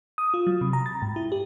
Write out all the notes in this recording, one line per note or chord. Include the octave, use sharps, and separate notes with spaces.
D#6
F4
F#3
C3
A#5
A6
G#2
E4
G4